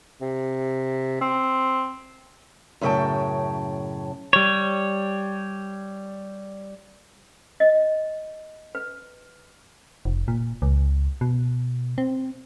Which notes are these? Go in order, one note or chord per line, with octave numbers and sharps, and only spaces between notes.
C3
C4
F#2 A2 C#3 C#5 G5 A5
G3 C#5
D#5
B4
F1
A#2
C#2
B2
C4